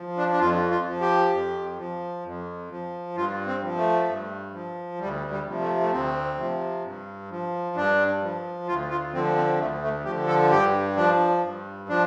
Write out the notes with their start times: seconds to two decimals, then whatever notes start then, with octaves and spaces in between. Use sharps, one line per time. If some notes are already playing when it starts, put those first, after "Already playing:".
Already playing: F3
0.17 D4
0.32 D4
0.40 F2 F4
0.71 F4
0.86 F3
1.01 G4
1.32 F2
1.78 F3
2.23 F2
2.70 F3
3.15 G2 F4
3.47 C4
3.62 F3
3.77 A3
4.08 G2
4.53 F3
4.99 D2 G3
5.30 G3
5.46 C3 F3
5.60 A3
5.80 A3
5.92 D2 C4
6.37 C3 F3
6.83 G2
7.30 F3
7.76 G2 D4
8.21 F3
8.67 D2 F4
8.90 F4
9.13 D3 F3 C4
9.36 C4
9.59 D2 A3
9.82 A3
10.05 D3 F3 G4
10.28 A4
10.51 G2 G4
10.96 F3 D4
11.43 G2
11.89 F3 D4